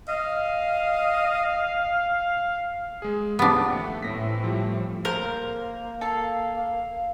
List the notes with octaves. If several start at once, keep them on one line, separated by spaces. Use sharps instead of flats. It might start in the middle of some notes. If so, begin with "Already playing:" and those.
D#5 F5
G#3 G#4
D#2 F3 B3 D4 G4
A3 C#7
A2 E3 C4 A#6 B6
F3 G3
A#3 A#4 C5
A4 F5